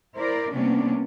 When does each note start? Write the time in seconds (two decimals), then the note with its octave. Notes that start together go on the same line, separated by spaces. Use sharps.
0.15 E4 A#4 C5 D5
0.52 C3 G3 A#3 B3 C#4 D4